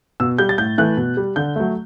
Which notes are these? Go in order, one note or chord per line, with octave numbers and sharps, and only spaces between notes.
B2 E6
G3 G6
A6
A2 G6
E3 A3 F#6
B2
G3
D3 G6
F#3 A3